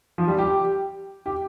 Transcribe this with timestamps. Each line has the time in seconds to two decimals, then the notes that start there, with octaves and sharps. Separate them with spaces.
0.18 F3
0.28 G3
0.38 G4
1.26 G4